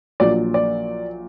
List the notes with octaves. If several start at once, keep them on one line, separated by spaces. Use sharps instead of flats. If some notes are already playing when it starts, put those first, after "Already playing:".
A#1 A#2 F#3 D5
D5